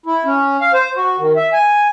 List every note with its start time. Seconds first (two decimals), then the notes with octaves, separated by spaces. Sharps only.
0.06 E4
0.25 C#4
0.61 F5
0.73 C5
0.96 F#4
1.19 D#3
1.36 E5
1.53 G#5